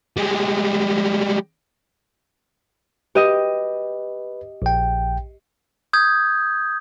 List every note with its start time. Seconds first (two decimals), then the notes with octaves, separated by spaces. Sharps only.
0.17 G3 G#3
3.15 G4 B4 D#5
4.62 A#1 G5
5.93 D#6 G6 G#6